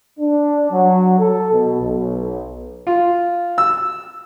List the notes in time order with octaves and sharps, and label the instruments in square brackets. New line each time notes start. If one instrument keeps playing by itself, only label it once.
[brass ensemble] D4
F#3
A4
B2
B1
[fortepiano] F4
E6